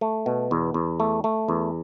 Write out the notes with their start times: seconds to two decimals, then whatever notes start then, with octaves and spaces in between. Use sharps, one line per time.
0.01 A3
0.26 B2
0.51 E2
0.74 E2
1.00 A3
1.24 A3
1.48 E2